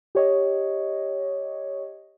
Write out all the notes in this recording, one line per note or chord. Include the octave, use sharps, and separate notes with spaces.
G4 C#5 D#5